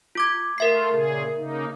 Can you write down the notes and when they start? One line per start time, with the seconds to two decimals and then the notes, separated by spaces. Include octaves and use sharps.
0.15 F4 D6 G#6
0.58 A3 F4 A#4 E5 C7
0.92 A#2 C#3 G#4
1.37 C#3 A#3 D#4